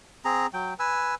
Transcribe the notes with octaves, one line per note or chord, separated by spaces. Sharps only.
C4 G#4 A#5
F#3 G5
B4 G#5 E6